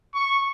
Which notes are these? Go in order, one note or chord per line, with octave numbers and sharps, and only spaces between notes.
C#6